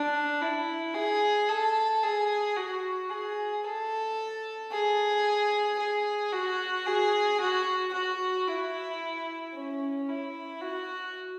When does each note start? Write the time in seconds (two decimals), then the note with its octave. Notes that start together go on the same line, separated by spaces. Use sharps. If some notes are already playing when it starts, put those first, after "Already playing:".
Already playing: D4
0.42 E4
0.95 G#4
1.49 A4
2.04 G#4
2.56 F#4
3.10 G#4
3.64 A4
4.72 G#4
5.79 G#4
6.32 F#4
6.87 G#4
7.40 F#4
7.93 F#4
8.48 E4
9.55 C#4
10.09 E4
10.62 F#4